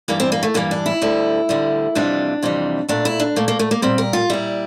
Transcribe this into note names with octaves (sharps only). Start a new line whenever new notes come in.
G2 E3 G3 A#3
C4
A#3
A3
G2 E3 G3 A#3
D4
E4
D2 D3 G3
D2 D3 G3
F2 C3 E3 G3 D4
F2 C3 E3 G3
A#2 A3 D4
E4
D4
A#2 A3 A#3
A#3
A3
A#3
A#2 G3 C4
A#4
F4
A#2 G3 E4